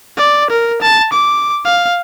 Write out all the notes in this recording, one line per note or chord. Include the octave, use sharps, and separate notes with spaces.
D5
A#4
A5
D6
F5